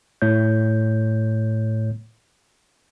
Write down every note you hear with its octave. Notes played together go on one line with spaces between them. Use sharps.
A2 A3 C#5 G6